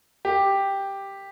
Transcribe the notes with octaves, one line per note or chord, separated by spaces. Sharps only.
G4